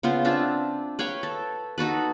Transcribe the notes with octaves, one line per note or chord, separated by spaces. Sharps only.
C#3 B3 F4 C5
C4 D4 F4 E5
B4 C#5 F5 G5
A4
D#4 F#4 A4 B4